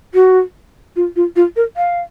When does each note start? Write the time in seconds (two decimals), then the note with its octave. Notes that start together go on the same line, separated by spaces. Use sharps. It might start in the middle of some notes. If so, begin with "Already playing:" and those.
0.14 F#4
0.96 F4
1.16 F4
1.36 F4
1.56 A#4
1.77 F5